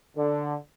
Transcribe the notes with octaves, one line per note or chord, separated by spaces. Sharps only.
D3